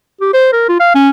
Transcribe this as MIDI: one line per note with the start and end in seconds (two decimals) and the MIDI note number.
0.21 0.31 67
0.34 0.50 72
0.53 0.65 70
0.69 0.79 65
0.80 0.91 77
0.95 1.10 61